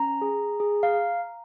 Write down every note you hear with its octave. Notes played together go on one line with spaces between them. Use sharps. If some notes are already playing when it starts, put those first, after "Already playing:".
Already playing: C#4 A#5
G#4
G#4
F5